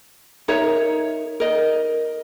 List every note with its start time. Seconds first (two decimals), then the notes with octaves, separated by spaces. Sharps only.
0.48 D#4 A#4 C#5 E5
1.40 A#4 D#5